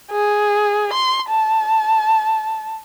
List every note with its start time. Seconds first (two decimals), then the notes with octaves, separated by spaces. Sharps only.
0.11 G#4
0.93 C6
1.29 A5